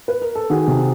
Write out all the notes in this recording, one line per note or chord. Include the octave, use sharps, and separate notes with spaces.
B4
A#4
A4
D#3 F#4 G#4
C3